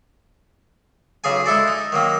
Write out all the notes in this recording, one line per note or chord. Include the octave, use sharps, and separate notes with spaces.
B1 C#3 G#4 G#5
G#3 E4 A4 D5
D#4
D#3 F#3 A#3